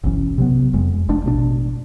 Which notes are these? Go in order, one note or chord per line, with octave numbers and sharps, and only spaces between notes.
F#1 B1 E3 C#4
C3 F#3 B3
E1 F2 G#3
F1 F2 A3 D4
A1 B2 D4